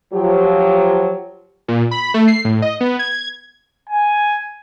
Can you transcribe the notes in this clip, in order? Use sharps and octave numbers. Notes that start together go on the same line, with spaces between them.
F3 F#3 G4
A#2
B5
A3
C7
A2
D#5
B3
G#6
G#5